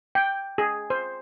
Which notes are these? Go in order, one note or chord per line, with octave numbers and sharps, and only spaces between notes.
G5
G#4
C5